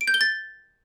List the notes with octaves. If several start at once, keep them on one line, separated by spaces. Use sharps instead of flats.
D7
G6
G7
A6